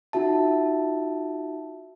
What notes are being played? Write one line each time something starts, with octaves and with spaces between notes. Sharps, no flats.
D#4 F4 F#4 E5 A5